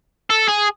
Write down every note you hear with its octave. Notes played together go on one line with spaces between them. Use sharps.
A4
G#4